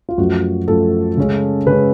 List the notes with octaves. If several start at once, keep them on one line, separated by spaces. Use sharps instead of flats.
F4
F#2 F3 A3 F#4
F#2 F3 A3 A4
C#3 G#3 C#4
C#3 G#3 C#4 B4